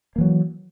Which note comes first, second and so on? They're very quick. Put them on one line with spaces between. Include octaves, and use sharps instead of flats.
A#3 E3 F#3